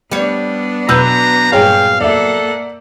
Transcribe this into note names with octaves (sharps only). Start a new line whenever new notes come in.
G3 B3 D4 C#5
B2 F#3 B4 A#5 E6 G6
G2 A#2 G#4 C#5 F5 G5
A#3 A4 D5 E5 F#5